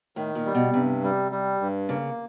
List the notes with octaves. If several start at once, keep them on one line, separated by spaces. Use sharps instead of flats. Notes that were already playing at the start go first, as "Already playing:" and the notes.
A2 D#3
A#2
G3
B2
G2 C3
G3
G3
G2
C#3 A#3